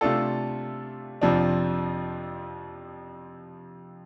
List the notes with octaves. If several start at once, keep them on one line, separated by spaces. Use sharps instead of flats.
C3 A3 D4 F4 A4
F2 C3 F3 D4